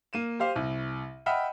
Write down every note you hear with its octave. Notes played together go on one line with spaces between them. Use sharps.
A#3 D#7 E7
G4 C5 F5
C2
D#5 E5 F#5 G5 B5 F6